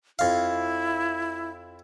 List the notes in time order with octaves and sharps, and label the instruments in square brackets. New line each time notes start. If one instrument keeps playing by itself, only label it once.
[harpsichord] F2 F5 [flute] E4